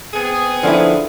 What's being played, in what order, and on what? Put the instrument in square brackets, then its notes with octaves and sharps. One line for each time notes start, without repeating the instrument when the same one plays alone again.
[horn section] B3 C4 G#4
[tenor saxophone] D3 [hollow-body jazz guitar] F3 C#4 E4